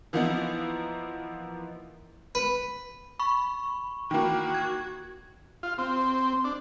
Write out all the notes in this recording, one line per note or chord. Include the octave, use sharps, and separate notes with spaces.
E3 F3 A#3 B3 D#4 E4
B4
B5 C#6
D#3 E3 A#3 F#4
G#6
F4
C4
D4